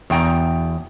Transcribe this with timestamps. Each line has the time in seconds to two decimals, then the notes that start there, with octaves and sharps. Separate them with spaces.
0.10 E2 B2 G5 A#5